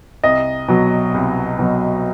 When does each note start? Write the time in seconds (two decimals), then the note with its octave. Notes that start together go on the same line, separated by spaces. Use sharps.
0.24 C2 D#5
0.68 B2 F#3
1.14 C2
1.59 B2 F#3